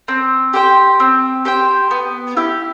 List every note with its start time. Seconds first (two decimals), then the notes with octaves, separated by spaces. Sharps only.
0.08 C4
0.53 G4 C5 G5
1.00 C4
1.45 G4 C5 G5
1.91 B3
2.37 E4 G4